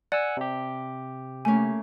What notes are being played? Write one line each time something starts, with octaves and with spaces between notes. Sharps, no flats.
D5 F#5 G#5 E6
C3 G4
A3 A#3 C#4 G#5